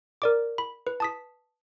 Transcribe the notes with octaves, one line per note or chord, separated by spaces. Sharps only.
A#4 D5 D6
B5
B4
A5 D#6 B6